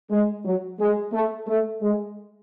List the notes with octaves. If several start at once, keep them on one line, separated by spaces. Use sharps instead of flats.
G#3
F#3
G#3
A3
A3
G#3